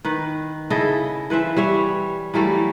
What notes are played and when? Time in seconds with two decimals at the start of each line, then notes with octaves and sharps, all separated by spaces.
0.05 D#3 B4
0.70 C#3 E4 A4 D#5
1.30 E3 B4 C5 E5
1.57 G3 C#5 E5
2.34 E3 F#3 G3 A3